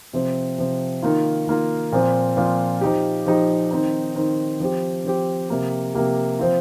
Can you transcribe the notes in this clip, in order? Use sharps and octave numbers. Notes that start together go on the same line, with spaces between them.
C3 F3 C4
C3 F3 C4
D#3 A#3 F4
D#3 A#3 F4
A#2 F3 C4 F4
A#2 F3 C4 F4
F3 D#4 G4
F3 D#4 G4
D#3 C4 D#4
D#3 C4 D#4
F3 C4 G4
F3 C4 G4
C3 F3 A#3 G4
C3 F3 A#3 G4
F3 C4 F4